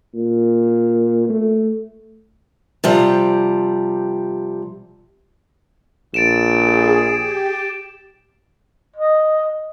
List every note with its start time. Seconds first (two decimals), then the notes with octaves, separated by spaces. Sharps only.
0.15 A#2
1.30 A3
2.84 C3 F3 G3
6.14 A#1 A6 D7 E7
6.46 G#4
7.11 G4
8.96 D#5